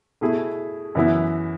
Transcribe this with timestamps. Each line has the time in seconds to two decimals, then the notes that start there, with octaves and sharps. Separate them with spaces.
0.21 B2 A3 E4 G#4
0.95 F#2 E3 B3 E4